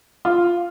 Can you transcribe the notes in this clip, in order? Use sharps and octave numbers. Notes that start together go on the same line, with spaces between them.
F4